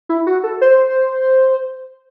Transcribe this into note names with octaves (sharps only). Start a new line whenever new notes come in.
E4
F#4
A4
C5